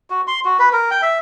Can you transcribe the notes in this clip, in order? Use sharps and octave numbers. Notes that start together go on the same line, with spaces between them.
F#4
C6
F#4
B4
A#4
G5
E5